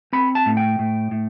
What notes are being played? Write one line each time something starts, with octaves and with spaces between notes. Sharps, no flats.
C4 B5
A5
A2
G5
A2
A2